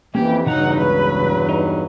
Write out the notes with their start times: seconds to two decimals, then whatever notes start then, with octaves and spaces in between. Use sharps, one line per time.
0.15 F2 E3 A#3 C#4 G4
0.46 E2 G2 C#3 F#3 D#4 F#5 A#5
0.78 C#2 C#3 B4
1.49 D#4